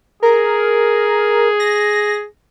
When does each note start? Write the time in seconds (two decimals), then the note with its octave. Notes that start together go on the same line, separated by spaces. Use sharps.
0.23 G#4 A#4
1.60 A#6